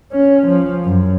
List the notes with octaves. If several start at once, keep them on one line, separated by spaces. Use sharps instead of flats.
C#4
F3
F#2